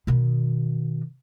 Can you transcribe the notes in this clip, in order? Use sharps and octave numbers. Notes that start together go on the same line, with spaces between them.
B2 D#3